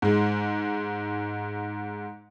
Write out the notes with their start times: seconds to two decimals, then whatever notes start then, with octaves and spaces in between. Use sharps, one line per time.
0.02 G#2 G#3